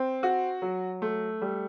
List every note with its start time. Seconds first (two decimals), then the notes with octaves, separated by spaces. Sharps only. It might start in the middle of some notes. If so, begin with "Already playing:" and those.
Already playing: C4
0.23 F#4
0.62 F#3
1.02 A3
1.42 G3